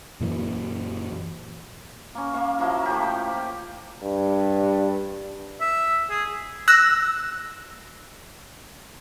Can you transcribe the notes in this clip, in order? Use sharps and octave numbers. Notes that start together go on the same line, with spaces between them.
F#2 A#2 E3
A#3 C#4
A#3 F5 C#6
F3 F#3 A#3 E4
A2 F3 G4
G5
A#3
G2
E5
G#4
E6 F#6 A#6